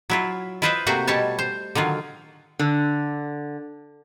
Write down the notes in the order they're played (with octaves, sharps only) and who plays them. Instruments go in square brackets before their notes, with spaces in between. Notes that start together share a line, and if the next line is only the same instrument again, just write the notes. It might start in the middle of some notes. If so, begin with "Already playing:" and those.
[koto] F#3 E4 F4
E4 F4 B4 C5 D#5 E5
C3 A3 A#3 F#4 C5
B2 G3 C#5 A5
C5
D3 D#3 F#3 F4
[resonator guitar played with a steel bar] D3